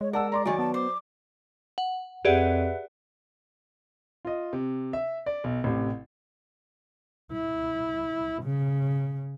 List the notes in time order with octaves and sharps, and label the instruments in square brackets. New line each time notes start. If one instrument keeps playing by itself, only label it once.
[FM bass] G#3 [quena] C#5
[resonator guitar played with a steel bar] A#4 [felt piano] D5 A5 E6 [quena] F#5
[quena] D5 [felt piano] A#5 C6 D6
[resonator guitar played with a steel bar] D#3 D5 [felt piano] F#3 [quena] G#5
[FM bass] B3 [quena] A5
[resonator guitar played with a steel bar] C5 [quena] D6
[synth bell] F#5
[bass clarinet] F2 [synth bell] G4 G#4 D5 [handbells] B4 E5 F#5
[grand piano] F4 D#5
C3
E5
D5
B1
A1 C3
[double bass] E4
C#3